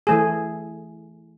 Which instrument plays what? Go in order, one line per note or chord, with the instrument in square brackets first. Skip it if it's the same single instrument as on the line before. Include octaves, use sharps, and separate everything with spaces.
[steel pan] E3 A3 G#4